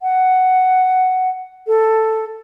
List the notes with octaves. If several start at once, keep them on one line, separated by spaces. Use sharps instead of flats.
F#5
A4